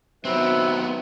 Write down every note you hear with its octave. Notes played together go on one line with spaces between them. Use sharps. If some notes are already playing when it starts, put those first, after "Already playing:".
C3 D#3 F#3 B3 C4 B4 E5